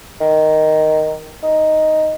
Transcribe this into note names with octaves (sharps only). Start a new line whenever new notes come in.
D#3
D#4